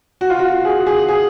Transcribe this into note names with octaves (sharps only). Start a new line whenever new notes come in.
F#4
F4
F#4
G#4
G#4
G#4